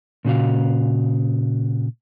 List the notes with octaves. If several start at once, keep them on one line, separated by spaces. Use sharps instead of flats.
A#2 C#3 F#4 F5